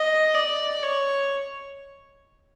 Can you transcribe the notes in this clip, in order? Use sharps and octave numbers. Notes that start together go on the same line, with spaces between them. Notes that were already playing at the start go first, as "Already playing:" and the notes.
Already playing: D#5
D5
C#5